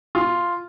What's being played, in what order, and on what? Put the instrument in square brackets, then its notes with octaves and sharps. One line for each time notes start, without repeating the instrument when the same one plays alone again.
[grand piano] F4